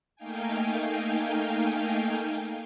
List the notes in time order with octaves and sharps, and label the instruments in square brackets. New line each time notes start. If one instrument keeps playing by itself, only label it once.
[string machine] A3 A#3 D#4 F5 G5 G#5